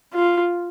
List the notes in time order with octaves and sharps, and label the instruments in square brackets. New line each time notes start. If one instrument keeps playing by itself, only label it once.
[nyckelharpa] F4